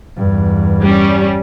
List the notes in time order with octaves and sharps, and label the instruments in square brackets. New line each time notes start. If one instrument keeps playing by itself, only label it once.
[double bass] E2 G2
[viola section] G3 C#4